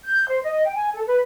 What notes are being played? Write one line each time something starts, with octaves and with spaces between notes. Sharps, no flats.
G6
C5
D#5
G5
G#5
A4
B4